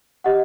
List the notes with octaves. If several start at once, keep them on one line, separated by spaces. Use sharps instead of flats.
G4 D#5 F#5